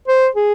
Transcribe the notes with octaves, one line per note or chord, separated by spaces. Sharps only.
C5
G#4